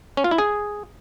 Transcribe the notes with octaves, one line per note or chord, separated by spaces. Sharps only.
C#4
F4
E4
G#4